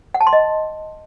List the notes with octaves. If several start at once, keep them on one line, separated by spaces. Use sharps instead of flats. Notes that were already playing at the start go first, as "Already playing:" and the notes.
F#5
A5
C6
D#5